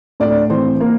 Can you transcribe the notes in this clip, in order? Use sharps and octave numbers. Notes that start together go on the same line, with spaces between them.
A2 D4 D5
E3 C4 C5
A#3 A#4